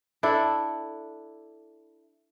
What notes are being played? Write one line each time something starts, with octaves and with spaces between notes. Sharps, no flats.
D4 E4 A4